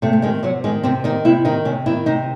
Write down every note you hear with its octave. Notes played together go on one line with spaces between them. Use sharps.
C3 A3
A3
D#3 G#3
C3 F#3
D#3 G#3
C3 C4
D#3 D#4
C3 E4
D#3 D#4
C3 C#4
D#3 E4
C3 D#4